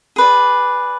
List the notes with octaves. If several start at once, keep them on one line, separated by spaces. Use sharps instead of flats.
G#4 B4 D5